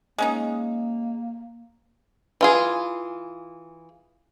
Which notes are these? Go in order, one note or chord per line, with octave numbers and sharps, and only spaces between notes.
G#3 A#3 C#4 D#4
E3 F4 G#4